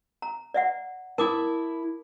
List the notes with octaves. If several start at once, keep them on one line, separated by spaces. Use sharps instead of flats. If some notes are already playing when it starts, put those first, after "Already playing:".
A#5
D5 E5 F#5
E4 A#4 A5 D6 D#6